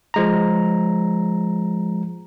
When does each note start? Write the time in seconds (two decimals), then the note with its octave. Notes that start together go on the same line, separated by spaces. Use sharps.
0.14 F3 G#3 A#5